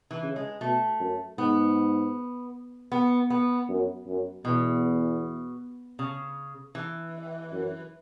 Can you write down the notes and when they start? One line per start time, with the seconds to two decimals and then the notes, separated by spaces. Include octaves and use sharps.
0.11 E3
0.23 C#3
0.36 G#3
0.61 B2 A3
1.00 F#2
1.38 G#2 B3
2.92 B3
3.30 B3
3.69 F#2
4.07 F#2
4.45 E2 B2
5.99 C#3
6.75 E3
7.52 F#2